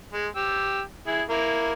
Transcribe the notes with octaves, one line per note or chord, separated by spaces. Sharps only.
G#3
G4 E6
E4 G#4
A#3 E4 A#4